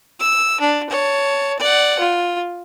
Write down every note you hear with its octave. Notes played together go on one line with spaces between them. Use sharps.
E6
D4
C#5 A5
D5 F#5
F4